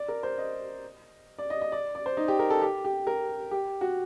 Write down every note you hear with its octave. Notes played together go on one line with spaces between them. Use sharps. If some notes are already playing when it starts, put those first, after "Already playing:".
Already playing: D5
A#4
C5
D#5
D5
D#5
D#5
D5
D5
C5
D#4
G4
A#4
A4
G4
G4
A#4
G4
F#4